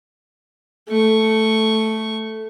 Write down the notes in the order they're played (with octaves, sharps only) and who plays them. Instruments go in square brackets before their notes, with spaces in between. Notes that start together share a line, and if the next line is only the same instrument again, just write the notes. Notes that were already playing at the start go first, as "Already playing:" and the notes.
[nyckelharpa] A3 C#6